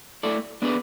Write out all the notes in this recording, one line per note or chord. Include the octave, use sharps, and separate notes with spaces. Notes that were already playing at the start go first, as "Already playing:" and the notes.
A3 E4 A4 D5
B3 D4 G#4 B4 D5